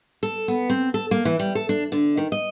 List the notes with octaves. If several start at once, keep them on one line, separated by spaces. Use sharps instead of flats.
A4
B3
C4
A4
A#3
E3
G3
A4
D4
D3
D#3
D#5